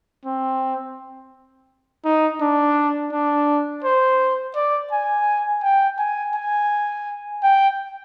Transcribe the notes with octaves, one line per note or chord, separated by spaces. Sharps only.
C4
D#4
D4
D4
C5
D5
G#5
G5
G#5
G#5
G5